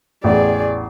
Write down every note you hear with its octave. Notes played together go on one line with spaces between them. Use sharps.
A1 E2 G#4 D5